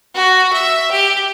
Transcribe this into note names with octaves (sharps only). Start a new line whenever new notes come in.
F#4
E5
G4